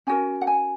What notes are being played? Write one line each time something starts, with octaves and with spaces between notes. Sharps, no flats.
C#4 F#4 A#4 G#5
F#5
G#5